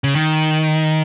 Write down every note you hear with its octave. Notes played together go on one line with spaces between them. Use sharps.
C#3
D#3